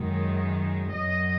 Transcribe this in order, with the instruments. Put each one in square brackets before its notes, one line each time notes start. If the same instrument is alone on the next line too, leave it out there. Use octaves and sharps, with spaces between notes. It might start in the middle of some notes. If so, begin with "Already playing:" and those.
Already playing: [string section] F#2 D#3 G#3
F#2 F#3 D#5